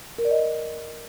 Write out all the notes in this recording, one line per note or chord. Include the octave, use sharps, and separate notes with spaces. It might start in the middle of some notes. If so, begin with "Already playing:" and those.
A#4
D5
D#5